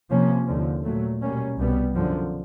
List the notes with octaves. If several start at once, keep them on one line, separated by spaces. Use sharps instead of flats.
C3 F3 A#3 C#4
D#2 D3 F3
A#2 F#3 A3
B2 G3 A#3 C#4
C2 B2 G3 B3
F#2 D3 F3